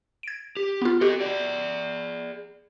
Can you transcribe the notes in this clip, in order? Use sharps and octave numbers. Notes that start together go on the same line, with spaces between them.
G#6 D7
G4
B3 F4
F#4 G4 A4 D#5
G#4 D5